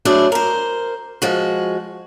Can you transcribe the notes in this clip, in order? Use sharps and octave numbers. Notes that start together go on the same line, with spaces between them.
F#3 A3 D4 E4 G#4
A#4 C5
F3 G#3 F#4